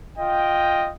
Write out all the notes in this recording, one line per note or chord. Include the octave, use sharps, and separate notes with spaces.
F4 D#5 G5